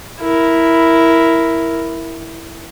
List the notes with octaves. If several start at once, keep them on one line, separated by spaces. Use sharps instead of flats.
E4 A#4